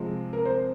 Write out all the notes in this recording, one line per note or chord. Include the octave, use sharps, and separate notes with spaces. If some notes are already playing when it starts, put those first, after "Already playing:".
Already playing: C3 F3 G#3 C4
A#4
C5